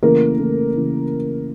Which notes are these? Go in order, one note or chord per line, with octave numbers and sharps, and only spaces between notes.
C#3 E3 A3 A#3 A#4
C#3 E3 A3
C#3 E3 A3